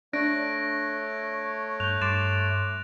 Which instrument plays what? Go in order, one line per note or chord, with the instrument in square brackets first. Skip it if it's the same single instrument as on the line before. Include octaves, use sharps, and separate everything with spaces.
[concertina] A3 C#5 [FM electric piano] D4 [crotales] F#6 A#6 D7
[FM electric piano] G2 G6 [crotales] F#6 F7
[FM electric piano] G2 C6 D6 [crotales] A6 D7 E7